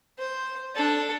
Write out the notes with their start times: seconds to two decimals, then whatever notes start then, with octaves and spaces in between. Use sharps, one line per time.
0.18 C5
0.75 D4 A4